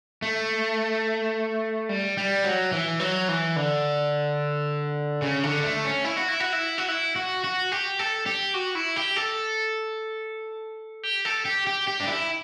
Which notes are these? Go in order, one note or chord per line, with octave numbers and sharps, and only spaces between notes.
A3
G3
G3
F#3
E3
F#3
E3
D3
C#3
D3
A3
C#4
E4
F#4
E4
F#4
E4
F#4
E4
F#4
F#4
G4
A4
G4
F#4
E4
G4
A4
G4
A4
G4
G4
G4
D4
E4